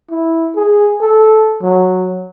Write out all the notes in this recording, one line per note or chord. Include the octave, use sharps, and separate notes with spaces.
E4
G#4
A4
F#3